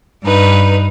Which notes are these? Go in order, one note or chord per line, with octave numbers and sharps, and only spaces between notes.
G2 D#4 B4